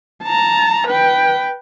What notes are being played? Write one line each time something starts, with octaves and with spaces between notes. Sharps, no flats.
A5 A#5
B4 G5